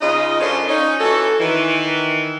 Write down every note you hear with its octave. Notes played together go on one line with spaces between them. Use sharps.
C#3 D#4 F4 D#5
F#2 C#4 D4 F4 A4 C5
C#4 D#4
E3 C#4 F#4 A4
D#3 E3